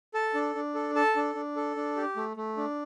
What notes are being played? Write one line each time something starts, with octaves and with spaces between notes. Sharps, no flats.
A4 A5
D4
D4
A4
A4 A5
D4
D4
A4
D4
G4
A3
A3
D4